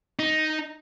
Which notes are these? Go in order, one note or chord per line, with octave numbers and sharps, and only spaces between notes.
D#4